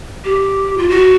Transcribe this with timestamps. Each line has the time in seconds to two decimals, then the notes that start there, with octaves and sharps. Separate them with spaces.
0.25 G4
0.78 F4
0.89 F#4